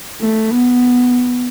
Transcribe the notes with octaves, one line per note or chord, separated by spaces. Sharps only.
A3
B3